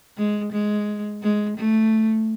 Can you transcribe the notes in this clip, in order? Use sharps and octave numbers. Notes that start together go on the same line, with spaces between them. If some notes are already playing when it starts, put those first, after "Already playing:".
G#3
G#3
G#3
A3